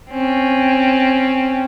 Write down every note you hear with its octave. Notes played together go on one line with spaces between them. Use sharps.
C4 C#4